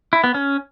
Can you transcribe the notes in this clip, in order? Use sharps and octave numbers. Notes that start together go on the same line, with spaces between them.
E4
B3
C#4